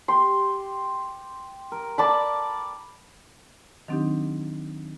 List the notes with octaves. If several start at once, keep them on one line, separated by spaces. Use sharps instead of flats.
G4 C6
A#4
D5 A5 B5
D#3 F#3 C4 D4 D#4 G4